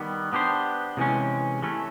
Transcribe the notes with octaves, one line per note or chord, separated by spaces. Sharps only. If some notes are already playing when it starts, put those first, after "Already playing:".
Already playing: D#3 G3 B3
B3 D4 G4 C5
C3 E3 G#3 C#4
E3 A3 C#4